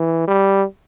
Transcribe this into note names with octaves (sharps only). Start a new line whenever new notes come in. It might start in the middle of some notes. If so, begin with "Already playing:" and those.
Already playing: E3
G3